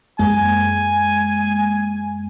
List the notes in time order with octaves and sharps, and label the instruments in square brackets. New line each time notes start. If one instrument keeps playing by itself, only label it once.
[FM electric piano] F#2 G#3 A#3 [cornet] G#5